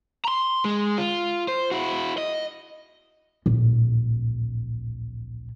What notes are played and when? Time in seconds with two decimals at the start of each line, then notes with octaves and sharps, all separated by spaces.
0.25 A#5 C6
0.65 G#3
0.98 F4
1.48 C5
1.71 E4 F#4
2.18 D#5
3.46 D1 A#1